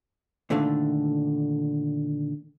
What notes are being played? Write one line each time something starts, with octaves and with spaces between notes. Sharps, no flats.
A#2 D3 D#3 A3